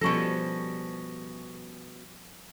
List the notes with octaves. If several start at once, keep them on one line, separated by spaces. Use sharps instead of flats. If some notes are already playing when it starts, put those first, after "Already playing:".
B2 F3 G3 C#4 A4 C#6 A#6